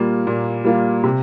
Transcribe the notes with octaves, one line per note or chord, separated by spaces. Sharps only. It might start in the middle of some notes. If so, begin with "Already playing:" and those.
Already playing: A#2 G3 A#3 F4
A#2
G3 A#3 F4
C3